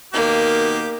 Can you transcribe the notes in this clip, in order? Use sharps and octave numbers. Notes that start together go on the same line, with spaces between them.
B2 D#3 A#3 G4